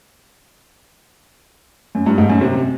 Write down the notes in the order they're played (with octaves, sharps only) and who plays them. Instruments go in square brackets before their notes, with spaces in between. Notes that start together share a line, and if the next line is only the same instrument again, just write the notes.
[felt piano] F#2
G2
G#2
F#2
C3